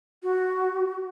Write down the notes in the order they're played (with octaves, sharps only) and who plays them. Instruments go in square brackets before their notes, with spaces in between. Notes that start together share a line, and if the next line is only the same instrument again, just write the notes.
[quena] F#4